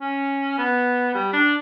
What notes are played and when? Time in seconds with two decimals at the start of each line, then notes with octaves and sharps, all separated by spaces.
0.01 C#4
0.58 B3
1.14 G3
1.33 D4